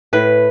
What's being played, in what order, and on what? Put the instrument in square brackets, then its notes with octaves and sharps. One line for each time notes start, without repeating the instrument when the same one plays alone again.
[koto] A2 B4